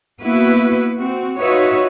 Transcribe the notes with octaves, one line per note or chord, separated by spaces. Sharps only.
A#3 B3 E4 F#4 B4
C4 F#4
D#4 F4 F#4 B4 C#5 E5